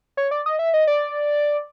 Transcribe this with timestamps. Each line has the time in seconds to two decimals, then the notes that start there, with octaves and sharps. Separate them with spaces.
0.17 C#5
0.31 D5
0.46 D#5
0.59 E5
0.74 D#5
0.87 D5